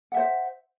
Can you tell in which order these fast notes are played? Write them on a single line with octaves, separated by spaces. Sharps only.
F#5 E5 C5